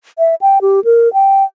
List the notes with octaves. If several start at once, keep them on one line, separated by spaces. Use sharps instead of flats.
E5
G5
G4
A#4
G5